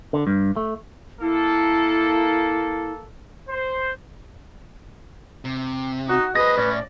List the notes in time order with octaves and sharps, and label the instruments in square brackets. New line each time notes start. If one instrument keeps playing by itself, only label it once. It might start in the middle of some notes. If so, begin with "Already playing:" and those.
[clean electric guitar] D3
G2
A3
[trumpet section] A#3 A4 [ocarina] E4
[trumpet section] C5
[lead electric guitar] C3
[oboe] D#4 [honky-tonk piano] F#4
[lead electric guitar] G#4 C5 [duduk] B4 [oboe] D#5 [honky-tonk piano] A#6
[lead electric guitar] A2 [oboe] C#4 [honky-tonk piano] D5